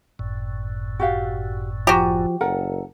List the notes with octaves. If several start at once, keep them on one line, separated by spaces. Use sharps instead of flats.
G1 F#2 A2
F#4 G4 F5
F3 F#4 G4 G#5 A#5
F#1 A4 A#4 F#5